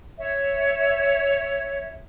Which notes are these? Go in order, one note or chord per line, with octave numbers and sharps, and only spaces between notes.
C#5 E5